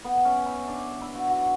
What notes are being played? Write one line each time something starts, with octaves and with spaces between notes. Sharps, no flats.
B3
C#4
E4
D4
E4
F#4
F#4